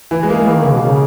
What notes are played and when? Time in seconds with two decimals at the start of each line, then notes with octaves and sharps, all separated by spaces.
0.11 E3
0.23 G#3
0.30 A#3
0.34 G#3
0.46 E3 A#3
0.56 D#3
0.64 C#3
0.73 B2
0.82 C#3